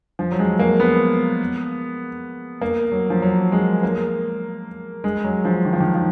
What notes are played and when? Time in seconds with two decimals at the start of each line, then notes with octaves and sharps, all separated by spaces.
0.19 F3
0.32 F#3
0.39 G#3
0.59 A#3
0.80 B3
2.61 A#3
2.92 F#3
3.10 F3
3.22 F#3
3.52 G#3
3.83 A#3
5.04 G#3
5.24 F#3
5.45 F3
5.65 D#3
5.73 F3
5.80 D#3
5.95 F3